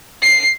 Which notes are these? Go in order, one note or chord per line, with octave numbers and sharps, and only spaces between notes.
C7